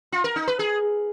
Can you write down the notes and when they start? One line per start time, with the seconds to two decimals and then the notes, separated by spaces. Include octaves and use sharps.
0.12 F4
0.24 A#4
0.36 D#4
0.48 B4
0.59 G#4